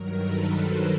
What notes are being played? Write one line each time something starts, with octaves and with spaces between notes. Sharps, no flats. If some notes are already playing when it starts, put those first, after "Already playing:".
Already playing: G2 D#3 F#3 A#4
A4 B4
A#4 C5